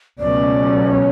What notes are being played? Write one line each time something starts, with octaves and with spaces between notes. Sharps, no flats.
C#2 B2 F#3 A3 C#4 D5
C#5